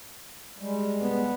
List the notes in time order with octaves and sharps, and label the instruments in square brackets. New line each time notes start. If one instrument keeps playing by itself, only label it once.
[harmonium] G3 G#3
[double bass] B3